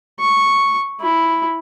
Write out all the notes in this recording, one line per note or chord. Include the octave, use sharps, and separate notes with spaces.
C#6
E4